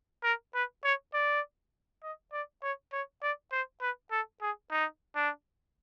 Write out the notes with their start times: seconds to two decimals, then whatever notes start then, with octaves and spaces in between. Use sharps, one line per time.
0.24 A#4
0.55 B4
0.84 C#5
1.14 D5
2.03 D#5
2.33 D5
2.63 C#5
2.93 C#5
3.23 D5
3.52 C5
3.82 B4
4.11 A4
4.42 G#4
4.71 D#4
5.16 D4